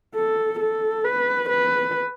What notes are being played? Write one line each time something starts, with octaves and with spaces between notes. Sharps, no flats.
A4
A4
B4
B4